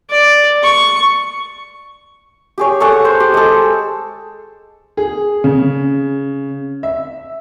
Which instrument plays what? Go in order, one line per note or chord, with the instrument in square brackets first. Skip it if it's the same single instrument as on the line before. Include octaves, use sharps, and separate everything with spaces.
[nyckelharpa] D5
C#6
[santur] G4 G#4 C#5
G#4 A4 C#5 F#5
C5
G4
G#3 A4
[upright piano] G#4
C#3
E5